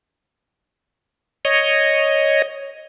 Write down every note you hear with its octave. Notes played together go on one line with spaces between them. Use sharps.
C#5 D#5